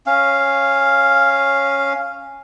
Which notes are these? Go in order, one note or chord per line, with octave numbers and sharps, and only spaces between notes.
C#4 F5